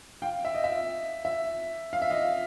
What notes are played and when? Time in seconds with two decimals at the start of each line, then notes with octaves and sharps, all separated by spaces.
0.22 F5 G5
0.45 E5
0.55 D#5
0.64 E5
1.25 E5
1.93 F5
2.02 E5
2.10 D#5 F5